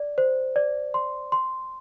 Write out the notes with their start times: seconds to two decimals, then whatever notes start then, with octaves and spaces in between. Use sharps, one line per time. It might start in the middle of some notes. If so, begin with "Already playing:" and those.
Already playing: D5
0.18 C5
0.56 D5
0.94 C6
1.32 C6